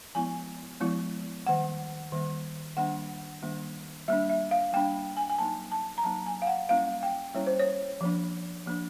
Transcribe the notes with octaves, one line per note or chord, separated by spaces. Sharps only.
F3 G#3 B3 E4 G#5
F3 G#3 B3 E4
D#3 G3 A#3 F#5
D#3 G3 A#3
D#3 G3 A#3 D4 F#5
D#3 G3 A#3 D4
G3 A#3 D4 E5
E5
F5
G3 A#3 D4 G5
G#5
G#5
F#3 A#3 D#4 A5
A5
A#5
F#3 A#3 D#4 A5
G#5
F5
F#5
G3 A#3 C#4 E4 F5
G5
G3 A#3 C#4 E4 C#5
C5
C#5
F3 A#3 D4
F3 A#3 D4